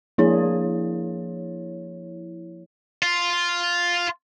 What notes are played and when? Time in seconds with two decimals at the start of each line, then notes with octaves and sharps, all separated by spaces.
0.18 F3 A#3 D4 E4 G#4 C#5
3.02 F4